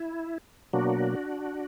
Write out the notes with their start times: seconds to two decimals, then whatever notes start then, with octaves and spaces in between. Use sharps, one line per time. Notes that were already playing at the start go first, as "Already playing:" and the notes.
Already playing: E4
0.73 B2 F#3 A#3 D4 F#4